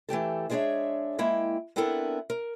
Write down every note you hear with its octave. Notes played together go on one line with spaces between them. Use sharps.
E3 A3 G4 A4
G#3 B3 D4 G#4 C#5 E5
G#3 A#3 E4 G5
B3 C4 D4 E4 A4 A#4
A#4